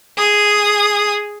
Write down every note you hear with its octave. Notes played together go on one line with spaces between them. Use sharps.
G#4 D#6